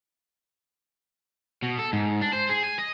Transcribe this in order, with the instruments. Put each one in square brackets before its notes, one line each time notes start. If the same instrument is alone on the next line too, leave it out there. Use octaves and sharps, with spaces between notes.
[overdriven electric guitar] B2
A4
G#2
D4
C5
G#4
G#5
D#5